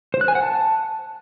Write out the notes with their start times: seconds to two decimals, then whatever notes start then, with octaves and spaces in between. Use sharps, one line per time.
0.14 C5
0.21 F#6
0.28 G#5
0.35 F#5
0.42 A5